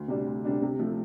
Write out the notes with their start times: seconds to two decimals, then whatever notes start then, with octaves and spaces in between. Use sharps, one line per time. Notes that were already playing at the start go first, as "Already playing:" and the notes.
Already playing: D2
0.08 C3 G3 D4
0.27 D2
0.45 C3 G3 D4
0.62 C3
0.79 F3 A3